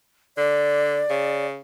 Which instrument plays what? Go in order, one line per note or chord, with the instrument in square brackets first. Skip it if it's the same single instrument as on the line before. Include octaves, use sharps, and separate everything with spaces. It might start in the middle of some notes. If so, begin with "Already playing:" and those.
[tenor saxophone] D3 [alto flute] D5
[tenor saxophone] C#3